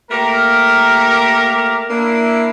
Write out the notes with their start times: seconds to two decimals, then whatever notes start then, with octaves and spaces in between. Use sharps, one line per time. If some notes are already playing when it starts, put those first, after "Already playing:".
0.10 A3 A#3 G4 A#4
1.89 A#3 D4 E4